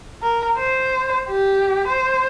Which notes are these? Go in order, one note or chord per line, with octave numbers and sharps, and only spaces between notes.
A#4
C5
G4
C5